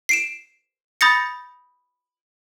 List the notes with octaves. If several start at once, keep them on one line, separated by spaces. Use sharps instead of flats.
C7 D7 E7
B5 D#6 G6 A6 A#6 C#7